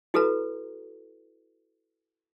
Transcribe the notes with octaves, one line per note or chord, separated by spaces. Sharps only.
E4 F#4 A4 B4 A#5